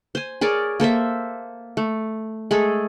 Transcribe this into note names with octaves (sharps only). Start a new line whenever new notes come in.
C5 G#5
G#4 A#4 C#5 D5
A#3 A4 C5 E5
A3
G#3 A3 G#4 A4